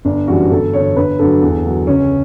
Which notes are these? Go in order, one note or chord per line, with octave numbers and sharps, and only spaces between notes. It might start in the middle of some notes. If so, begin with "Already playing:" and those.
G1 D4
F#2 E3 G3 F#4
G1 A4
G2 D3 C#5
G1 B4
G2 D3 F#3 A4
E2
D3 F#3
C#2 C#4